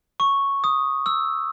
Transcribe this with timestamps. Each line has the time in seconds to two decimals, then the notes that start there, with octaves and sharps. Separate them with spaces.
0.20 C#6
0.64 D#6
1.06 E6